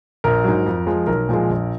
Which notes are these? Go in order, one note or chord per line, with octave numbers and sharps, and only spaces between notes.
A#1 A#4
G#2 F#3
F2
F3 G#3
B1 A#4
A#2 F3 G#3
A#1